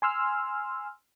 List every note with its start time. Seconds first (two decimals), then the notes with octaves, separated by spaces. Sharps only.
0.02 G#5 C6 E6 F6